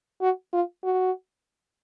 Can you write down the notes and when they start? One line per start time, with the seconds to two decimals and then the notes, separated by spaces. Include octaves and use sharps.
0.21 F#4
0.53 F4
0.84 F#4